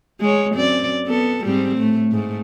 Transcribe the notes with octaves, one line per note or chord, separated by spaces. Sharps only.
G#3 C#5
F#2 C4 D5
B3 A4
G#2 G3 C4
A2 A3
G#2 A3